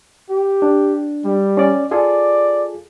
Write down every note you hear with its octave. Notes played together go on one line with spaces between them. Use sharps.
G4
D4
G3
C#4 D5
F4 G#4 A4 D5